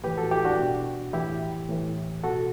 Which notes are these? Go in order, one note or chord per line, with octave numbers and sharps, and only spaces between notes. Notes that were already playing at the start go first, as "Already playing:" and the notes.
A2 E3 G4 B4
F#4 A4
E4 G4
D4 F#4
B2
A2 E3 E4 G4
A2 E3
B2 F#4 A4